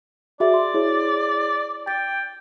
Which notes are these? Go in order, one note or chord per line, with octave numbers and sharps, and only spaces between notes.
F#4 G#4 D5 E5
C6
E4 G#4 C#5
G5 A6